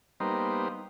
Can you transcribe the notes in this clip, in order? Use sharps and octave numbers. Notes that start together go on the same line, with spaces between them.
G3 A#3 B3 D#4 C5